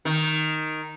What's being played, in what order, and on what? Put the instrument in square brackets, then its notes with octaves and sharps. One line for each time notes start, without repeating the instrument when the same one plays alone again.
[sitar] D#3